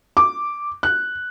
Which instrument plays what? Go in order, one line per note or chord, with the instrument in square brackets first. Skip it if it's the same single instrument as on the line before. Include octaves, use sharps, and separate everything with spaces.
[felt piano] D6
F#6